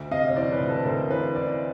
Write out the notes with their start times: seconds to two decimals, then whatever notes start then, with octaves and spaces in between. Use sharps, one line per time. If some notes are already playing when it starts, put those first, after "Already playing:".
Already playing: D2
0.11 C3 D#5 F5
0.28 C#5
0.36 E3 C5 D5
0.52 B4 C#5
0.60 D2
0.69 A4 B4
0.85 D2 A#4 C5
1.10 E3 B4 C#5
1.35 E3 C5 D5